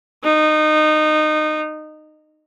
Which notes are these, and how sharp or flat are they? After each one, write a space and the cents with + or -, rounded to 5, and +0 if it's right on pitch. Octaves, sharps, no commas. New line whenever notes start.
D#4 -20